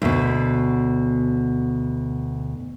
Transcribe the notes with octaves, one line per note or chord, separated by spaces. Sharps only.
D2 B2